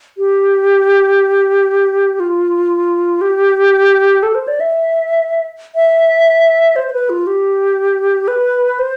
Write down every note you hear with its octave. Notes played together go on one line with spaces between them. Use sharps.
G4
F4
G4
A4
C5
D5
E5
E5
C5
C5
B4
F4
G4
B4
C5